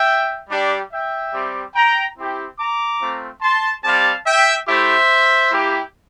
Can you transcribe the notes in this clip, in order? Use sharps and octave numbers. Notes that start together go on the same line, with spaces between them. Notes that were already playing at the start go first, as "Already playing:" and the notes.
Already playing: E5 G5
G3 D4 G4
E5 G5
G3 C4 G4
G5 A#5
C4 E4 G4
A#5 D6
A3 C4 F4
A5 C6
G3 C4 G4 F5 A5
E5 G5
A3 E4 G4 C5 E5
A#3 E4 G4